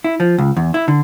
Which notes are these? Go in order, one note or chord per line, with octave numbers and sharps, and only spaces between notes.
E4
F3
C#2
E2
E4
D3